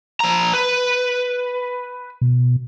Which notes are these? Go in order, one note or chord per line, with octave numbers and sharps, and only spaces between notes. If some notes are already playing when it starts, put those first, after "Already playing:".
F3 A#5
B4
B2